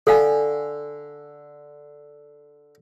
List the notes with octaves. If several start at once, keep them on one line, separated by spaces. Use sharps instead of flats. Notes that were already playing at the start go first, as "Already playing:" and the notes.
D3 A4 F5 G#5